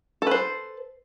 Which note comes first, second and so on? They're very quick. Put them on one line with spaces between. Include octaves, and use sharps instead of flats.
A4 B4 C5